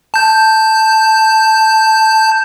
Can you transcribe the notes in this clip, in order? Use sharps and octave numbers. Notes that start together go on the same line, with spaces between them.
A5 G6